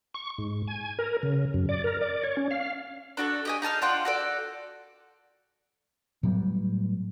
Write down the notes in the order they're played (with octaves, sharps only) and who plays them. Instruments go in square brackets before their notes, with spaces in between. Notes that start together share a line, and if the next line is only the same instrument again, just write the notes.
[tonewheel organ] C#6
G#2
G#5
A#4
C#3
F#2
D5
A#4
D5
C#5
C#4
F5
[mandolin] D4 F#4 A4
G4 D#5 G#5
D#4 G#4 A5 F6
D4 F4 F#5 G5
F#4 A4 D5
[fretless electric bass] A2 F#3 G3 B3